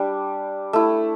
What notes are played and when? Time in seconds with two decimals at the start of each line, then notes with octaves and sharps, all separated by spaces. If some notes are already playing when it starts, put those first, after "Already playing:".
Already playing: G3 D4
0.73 A3 E4